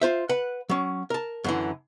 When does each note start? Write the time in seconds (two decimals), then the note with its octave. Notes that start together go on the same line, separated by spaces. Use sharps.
0.01 F4 C5 E5
0.29 B4 F#5
0.69 F#3 C#4
1.10 A#4 A5
1.44 F#2 D3 E3